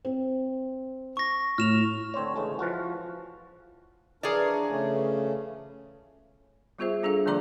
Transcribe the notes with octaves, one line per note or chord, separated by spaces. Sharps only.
C4
C#6 A#6
A2 F6 E7 F7
D3 C4 C5 C#5
C#3 E3 G#3 A3
E3 F3 F4 F#4
E3 F3 D4 G#4 A#4 C#5 D5
C#3 A3 C#4
G3 B3 F4 G#4 C5 E5
G3 D4 G#4 A4 F5
D3 F3 A#3 D5 A#5 D6